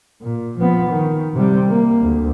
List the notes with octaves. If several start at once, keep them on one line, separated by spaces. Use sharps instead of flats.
A#2
F3 B3
D#3
C3 G3
A#3
D2